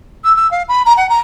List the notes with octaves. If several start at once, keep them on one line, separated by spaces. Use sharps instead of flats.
E6
E6
F5
B5
A#5
F#5
A#5